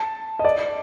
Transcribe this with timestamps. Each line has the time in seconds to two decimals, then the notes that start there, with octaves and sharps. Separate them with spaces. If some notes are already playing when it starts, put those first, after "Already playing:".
Already playing: A5
0.39 D#5
0.45 D5